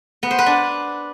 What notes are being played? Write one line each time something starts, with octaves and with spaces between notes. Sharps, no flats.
B3
C5
B4
D4